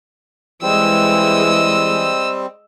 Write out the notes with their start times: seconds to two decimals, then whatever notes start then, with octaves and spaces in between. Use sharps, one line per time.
0.63 E3 G3 G#3 C4 D#5 E6